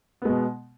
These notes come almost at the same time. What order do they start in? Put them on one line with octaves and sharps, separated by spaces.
B3 G#3 B2